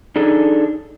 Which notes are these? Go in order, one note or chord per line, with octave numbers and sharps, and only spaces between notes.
D4 D#4 G#4 A4